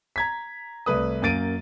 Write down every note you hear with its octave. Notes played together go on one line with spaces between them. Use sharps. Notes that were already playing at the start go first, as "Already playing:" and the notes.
A#5 G#6 B6
C2 A3 B4 D#6
F#2 A#3 A6 D7 D#7